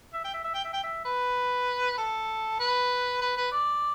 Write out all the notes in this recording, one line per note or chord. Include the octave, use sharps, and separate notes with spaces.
E5
G5
E5
E5
G5
E5
G5
E5
B4
A4
B4
B4
B4
D5